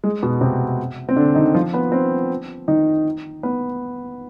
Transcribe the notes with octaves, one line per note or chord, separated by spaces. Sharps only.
G#3
B2 B3
C3 C4
C4
D3 D4
D#3 D#4
F3 F4
B3 B4
C4 C5
D#3 D#4
B3 B4